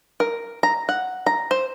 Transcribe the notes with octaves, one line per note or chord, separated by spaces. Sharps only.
A#4
A#5
F#5
A#5
C5